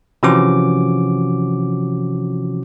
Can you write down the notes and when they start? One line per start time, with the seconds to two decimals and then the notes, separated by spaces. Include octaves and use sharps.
0.23 C3 E3 F3 C#4 F#4 D6